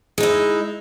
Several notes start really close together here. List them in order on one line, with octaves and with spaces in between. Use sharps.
G#3 D#4 E4